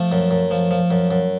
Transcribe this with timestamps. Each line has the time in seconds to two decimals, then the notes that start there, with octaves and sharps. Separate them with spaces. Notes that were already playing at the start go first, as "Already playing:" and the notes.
Already playing: F3 A3
0.12 F#2
0.31 F#2
0.51 F3
0.71 F3
0.91 F#2
1.11 F#2